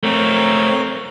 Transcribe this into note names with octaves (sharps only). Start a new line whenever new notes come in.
A3 C4 A#4 C#5